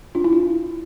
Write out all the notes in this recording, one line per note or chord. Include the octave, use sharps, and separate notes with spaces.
D4 F4
E4
F4